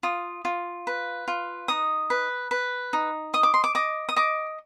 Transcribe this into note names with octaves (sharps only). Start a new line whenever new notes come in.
F4 D#6
F4
B4
F4
D#4 D#6
B4
B4
D#4
D#5 D#6
D6
C6
D6
D#5 D6
D#6
D#5 D6